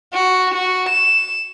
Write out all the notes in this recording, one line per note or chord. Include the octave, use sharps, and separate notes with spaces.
F#4
F#4
E7